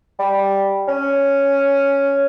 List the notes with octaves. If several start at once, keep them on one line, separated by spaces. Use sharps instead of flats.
G3
C#4